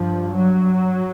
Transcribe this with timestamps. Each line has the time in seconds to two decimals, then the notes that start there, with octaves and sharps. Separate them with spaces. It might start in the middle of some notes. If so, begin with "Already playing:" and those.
Already playing: G2 F3
0.35 F#3